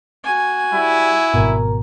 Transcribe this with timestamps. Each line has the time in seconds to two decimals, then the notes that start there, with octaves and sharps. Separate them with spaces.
0.24 F#4 G#5
0.73 G3 E4
1.34 G#1 B2 A#4